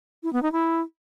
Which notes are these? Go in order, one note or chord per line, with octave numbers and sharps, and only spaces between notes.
E4
B3
D#4
E4